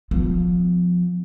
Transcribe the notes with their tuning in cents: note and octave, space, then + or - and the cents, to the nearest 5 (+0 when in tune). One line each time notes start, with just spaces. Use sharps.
F3 +20 B3 +40